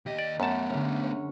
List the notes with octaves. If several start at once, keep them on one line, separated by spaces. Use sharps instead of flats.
D#2 G4 D#5
D5
F#2 A3 B3 A5
D3 G#3 C#4
C#5